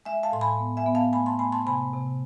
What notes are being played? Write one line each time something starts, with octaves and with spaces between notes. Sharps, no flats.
G#3 E5 G#5
F5 A5
A2 C6
G#5 B5
B3
E5 G#5
B3
F5 A5
A3 G#5 B5
A5 C6
A3 G#5 B5
A5 C6
C3 G#5 B5
C3